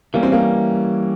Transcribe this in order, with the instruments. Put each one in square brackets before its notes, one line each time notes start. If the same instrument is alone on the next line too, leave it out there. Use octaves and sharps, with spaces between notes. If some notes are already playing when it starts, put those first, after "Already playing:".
[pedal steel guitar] E3 G3 C#4 [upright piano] A#3
[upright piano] C4
A#3